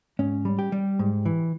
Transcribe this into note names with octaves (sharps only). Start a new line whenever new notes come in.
G#2 C#4
G3
G4
G3
G#2
E3